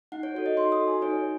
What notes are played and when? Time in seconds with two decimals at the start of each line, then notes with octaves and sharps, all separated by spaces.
0.12 D#4 F#5
0.23 C#5
0.35 F#4 A4 C#5
0.46 D#5
0.57 D#4 C6
0.72 D#6
0.79 F#4 A4
0.88 G#5
1.02 D#4 C#5